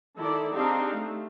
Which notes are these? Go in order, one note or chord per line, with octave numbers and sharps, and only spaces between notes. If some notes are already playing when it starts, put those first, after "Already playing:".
D#3 E4 A4 D5
C4 D4 D#4 G4 G#4 F5
A3